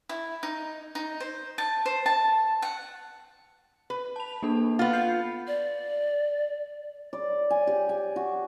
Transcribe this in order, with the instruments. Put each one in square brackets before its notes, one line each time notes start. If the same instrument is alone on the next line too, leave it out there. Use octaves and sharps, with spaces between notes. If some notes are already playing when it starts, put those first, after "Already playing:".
[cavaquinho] E4
D#4
D#4
C5
A5
C5
A5
F#5
[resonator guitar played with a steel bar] B4
[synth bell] A5 F7
A#3 D4 A4
[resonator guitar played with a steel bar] B3 F4
[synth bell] F#5 G6 C7
[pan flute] D5
[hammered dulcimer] D5
G#5
G4
G#5
F#4